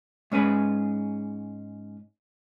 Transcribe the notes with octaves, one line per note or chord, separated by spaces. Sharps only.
G#2 C#4 G#4 B4